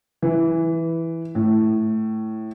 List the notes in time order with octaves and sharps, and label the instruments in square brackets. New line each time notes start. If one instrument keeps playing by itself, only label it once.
[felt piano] E3
A2